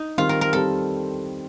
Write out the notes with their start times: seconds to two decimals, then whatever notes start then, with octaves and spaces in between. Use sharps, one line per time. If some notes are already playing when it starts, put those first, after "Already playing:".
Already playing: D#4
0.18 D#3 G3 C4 F4
0.29 A#4
0.41 A#4
0.53 D#3 G3 C4 A4